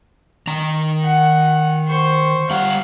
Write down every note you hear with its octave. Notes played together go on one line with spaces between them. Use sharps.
D#3 A#5
F#5
C5 C#6
G3 F5 F#5